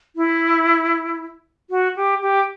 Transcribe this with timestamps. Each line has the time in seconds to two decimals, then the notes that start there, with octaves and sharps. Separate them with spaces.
0.16 E4
1.70 F#4
1.97 G4
2.22 G4